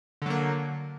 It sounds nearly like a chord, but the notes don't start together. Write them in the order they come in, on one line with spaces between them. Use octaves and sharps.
D3 F#3 A#3